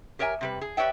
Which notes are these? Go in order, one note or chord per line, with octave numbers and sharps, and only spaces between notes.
G4 A#4 C#5 E5 G#5
C3 G3 B4
G#4
G4 B4 C#5 D5 E5 G5